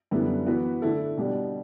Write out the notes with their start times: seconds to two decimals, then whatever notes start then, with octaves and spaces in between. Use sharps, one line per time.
0.11 F#2 D3 G3 B3 E4
0.46 E3 B3 F#4 B4
0.82 D3 A3 E4 A4
1.17 B2 G3 D4 G4